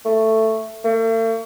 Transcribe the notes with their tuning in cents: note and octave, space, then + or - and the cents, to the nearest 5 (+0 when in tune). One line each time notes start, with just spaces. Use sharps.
A3 +10
A3 +45